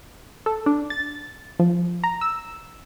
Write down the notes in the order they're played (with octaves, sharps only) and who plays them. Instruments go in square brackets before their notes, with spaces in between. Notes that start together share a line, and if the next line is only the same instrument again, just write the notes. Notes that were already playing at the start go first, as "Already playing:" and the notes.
[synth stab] A4
D4
A6
F3
A#5
E6